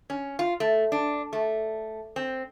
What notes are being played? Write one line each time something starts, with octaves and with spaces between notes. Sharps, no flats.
C#4
F4
A3
D4
A3
C4